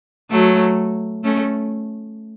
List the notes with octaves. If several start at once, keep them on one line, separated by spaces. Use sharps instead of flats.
F#3 A3
A3 C#4